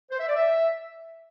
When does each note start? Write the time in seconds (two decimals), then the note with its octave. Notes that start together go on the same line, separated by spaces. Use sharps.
0.11 C5
0.19 E5
0.28 D5
0.36 E5